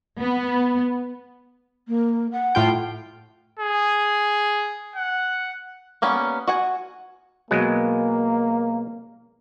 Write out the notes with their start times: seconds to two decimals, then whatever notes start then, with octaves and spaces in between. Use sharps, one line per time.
0.19 B3
1.88 A#3
2.32 F#5
2.55 A2 F4 G5
3.60 G#4
4.96 F#5
6.02 G3 A#3 B3 C#4
6.47 F#4 F#5 G#5
7.51 B2 F#3 G#3 A#3